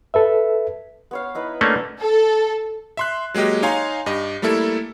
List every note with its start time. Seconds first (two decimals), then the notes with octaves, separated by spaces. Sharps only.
0.14 A4 B4 E5
1.11 B3 C#5 F5
1.35 D#4 E4 B4
1.61 A3 A#3 C#4 D4
1.99 A4
2.97 E5 C6 F#6
3.34 F#3 G#3 A#3 G4 D#5
3.62 D#4 C#5 F5 G#5 A#5 C6
4.06 G2 G4 D#5
4.42 G3 A3 A#3 E4 A4